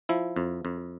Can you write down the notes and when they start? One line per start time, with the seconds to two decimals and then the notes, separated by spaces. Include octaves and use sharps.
0.09 F3 E4
0.36 F2
0.65 F2